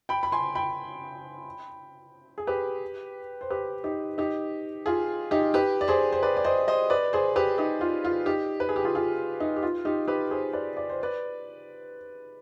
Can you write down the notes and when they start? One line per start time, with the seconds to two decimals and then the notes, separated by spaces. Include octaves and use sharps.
0.09 G5 B5
0.23 B5
0.32 G#5 C6
0.55 G5 B5
2.38 G#4
2.47 G4 B4
3.41 C5
3.50 G4 B4
3.84 D#4 G4
4.18 D#4 G4
4.86 F4 G#4
5.31 D#4 G4
5.54 G4 B4
5.81 D5
5.88 G#4 C5
6.12 C5
6.23 B4 D5
6.37 D5
6.44 C5 D#5
6.68 C5 D#5
6.90 B4 D5
7.13 G#4 C5
7.36 G4 B4
7.58 D#4 G4
7.81 F4
8.04 F4
8.26 D#4 G4
8.60 B4
8.69 G#4
8.76 G4
8.85 F4 G#4
8.95 F4 G#4
9.40 D#4
9.56 G4
9.63 F4
9.85 D#4 G4
10.08 G4 B4
10.31 G#4 C5
10.53 B4 D5
10.77 D5
10.90 C5
11.03 B4 D5